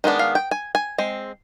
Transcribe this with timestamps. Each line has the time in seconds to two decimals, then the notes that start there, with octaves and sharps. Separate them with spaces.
0.04 D#3 G#3 B3 D4
0.19 F5
0.35 G5
0.51 G#5
0.75 G#5
0.98 G#3 C4